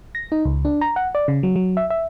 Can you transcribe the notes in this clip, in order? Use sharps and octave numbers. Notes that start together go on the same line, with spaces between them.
A#6
D#4
C#2
D4
A#5
F#5
D5
C#3
F#3
F#3
E5
E5